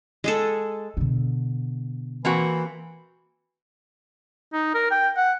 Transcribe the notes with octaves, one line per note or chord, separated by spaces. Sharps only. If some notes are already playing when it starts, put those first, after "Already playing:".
G#3 G#4 A4
B2 D3
E3 A#3 C4 F#4
D#4
A#4
G5
F#5